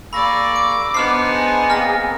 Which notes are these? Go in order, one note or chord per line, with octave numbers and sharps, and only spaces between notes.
A#3 G#4 D5 B5 C#6 E6 A#6
D6 D7
B3 D4 D#4 C5 A5 F6 C7
G#4
A#3 C4 A#4 F6 A#6